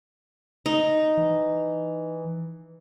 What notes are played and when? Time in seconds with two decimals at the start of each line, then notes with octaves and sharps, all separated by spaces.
0.66 D#4
1.17 E3